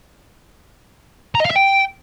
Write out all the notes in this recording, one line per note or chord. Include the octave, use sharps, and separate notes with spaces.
A#5
D#5
F5
E5
G5